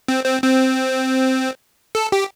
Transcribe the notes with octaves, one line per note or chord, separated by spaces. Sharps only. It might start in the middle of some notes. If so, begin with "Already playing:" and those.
C4
C4
C4
A4
G4